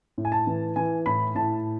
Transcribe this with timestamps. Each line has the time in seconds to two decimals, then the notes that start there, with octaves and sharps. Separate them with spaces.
0.18 A2
0.25 G#5
0.32 A5
0.47 E3
0.76 E3 G#5
1.06 A2 B5
1.35 A2 A5